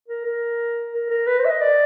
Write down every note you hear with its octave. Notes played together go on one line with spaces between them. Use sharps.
A#4
A#4
A#4
A#4
B4
C5
E5
D#5
D5